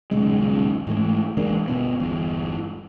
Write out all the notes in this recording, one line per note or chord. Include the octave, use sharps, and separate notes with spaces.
D#1 B1 C#3 G#3
G#2 E3 A3
E3 G#3 A#3 D4
G1 B2 B3
G1 E2